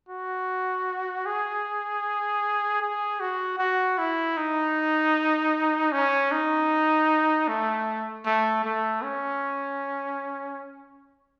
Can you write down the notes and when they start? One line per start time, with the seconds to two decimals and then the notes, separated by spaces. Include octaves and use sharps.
0.09 F#4
1.26 G#4
2.81 G#4
3.20 F#4
3.59 F#4
3.98 E4
4.37 D#4
5.92 C#4
6.31 D#4
7.48 A3
8.26 A3
8.64 A3
9.03 C#4